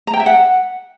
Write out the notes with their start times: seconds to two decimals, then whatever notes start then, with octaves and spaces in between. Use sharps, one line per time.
0.07 A#5
0.14 G5
0.20 E5
0.26 F#5